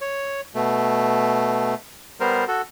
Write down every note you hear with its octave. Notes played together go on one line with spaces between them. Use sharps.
C#5
B2 A3
G3 B3 A#4 C5
F#4 A4